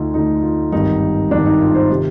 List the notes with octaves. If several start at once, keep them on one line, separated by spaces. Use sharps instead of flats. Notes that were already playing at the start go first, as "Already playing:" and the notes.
Already playing: D2 D3 D#4 F4
D2 D3 D#4
F4
G#1 G2 D#3 D#4
G#1 G2 D#3 D4
D#4
F4
C5
C3 D#3